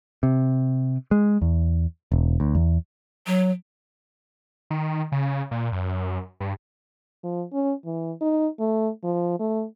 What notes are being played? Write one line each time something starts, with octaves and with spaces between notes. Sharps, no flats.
C3
G#3
E2
E1
D2
E2
F#3
D#3
C#3
A#2
F#2
G2
F3
C#4
E3
D#4
A3
F3
A3